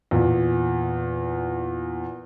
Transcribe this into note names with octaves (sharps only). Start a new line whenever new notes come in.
E2 A#2